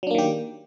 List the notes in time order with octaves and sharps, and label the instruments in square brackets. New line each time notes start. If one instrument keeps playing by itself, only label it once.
[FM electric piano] F#3
D4
A#3
D#3
G4